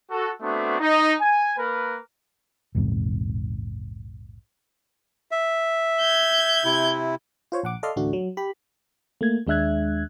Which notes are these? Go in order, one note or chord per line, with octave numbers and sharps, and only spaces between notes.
F#4 A4
A3 B3 C4 D4 F#4
D#4
G#5
A#3 A#4 B4
A#1 E2 G#2 C3
E5
G6 G#6
C3 E4
F4 C5 C#5
A#1 F#5 D6
A4 D5 D#5 F5 C6 F6
A1 D2 A3 D4 F#4
F#3
G4 B5
A3 A#3 G#6
D#2 G#3 D4 E5 F#6 G#6